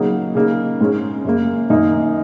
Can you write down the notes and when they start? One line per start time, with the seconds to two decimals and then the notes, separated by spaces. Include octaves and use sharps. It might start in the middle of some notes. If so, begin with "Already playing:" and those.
Already playing: C#3 F#3 A#3 D#4
0.35 C#3 A#3 D#4
0.81 G#2 G#3 C#4
1.25 F#2 C#3 A#3
1.70 F#2 D#3 A#3 D#4